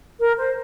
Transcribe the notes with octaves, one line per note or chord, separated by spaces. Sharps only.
A#4
C5